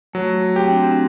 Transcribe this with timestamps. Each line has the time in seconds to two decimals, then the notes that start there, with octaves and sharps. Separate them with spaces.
0.13 F#3 A3
0.56 C4 G4
0.70 D4
0.84 C4